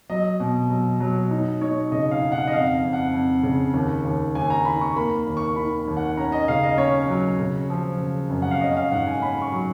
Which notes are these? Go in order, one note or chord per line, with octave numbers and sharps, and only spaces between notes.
F#3 D#5
B2
F#3
F#3
D#4
D#4 C#5
C#3 D#5
F5
D#4
F#5
D#5
F2 F5
F2
F#5
F2
C#3
D#2
D#2
D#2 G#5
A#5
D#3 B5
C#6
A#3 B5
D#2
C#6
D#3 B5
D#2
F#5
C#4 A#5
D#5
C#3 F5
D#5
C#4 C#5
F#3
C#3
F3
C#3
F#2
F#5
F5
C#4 D#5
F5
G#2 F#5
G#5
C#4 B5
C#6
F#3